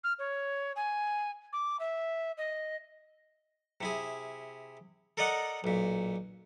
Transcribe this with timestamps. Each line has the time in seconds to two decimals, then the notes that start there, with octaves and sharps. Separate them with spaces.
0.04 F6
0.19 C#5
0.76 G#5
1.53 D6
1.79 E5
2.37 D#5
3.81 C3 E4 G#4
5.17 A4 A#4 D5 D#5 F#5
5.64 B1 A#2